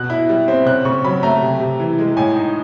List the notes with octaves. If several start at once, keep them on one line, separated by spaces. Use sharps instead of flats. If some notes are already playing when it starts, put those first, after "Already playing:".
Already playing: B2 F#6
E4
G3
C4
C#3 F#6
C#3 C#6
F#3 B5
A3 A#5
C3
C3
E3
G#3
A2 G#5
D#4